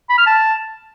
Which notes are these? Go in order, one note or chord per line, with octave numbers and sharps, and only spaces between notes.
B5
F6
A5